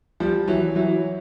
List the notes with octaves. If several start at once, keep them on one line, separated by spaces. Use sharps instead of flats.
F3 G3
E3 F#3
E3 F#3